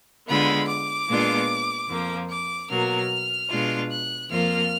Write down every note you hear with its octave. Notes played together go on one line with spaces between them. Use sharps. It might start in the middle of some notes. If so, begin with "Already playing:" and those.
D3 G#3 B3 F4 B5
D6
A#2 G#3 B3 D4 F4
F2 F3 A#3
D6
B2 F#3 A#3 F6
B2 G#3 D4 F4
F#6
F2 F3 A#3 F4 F6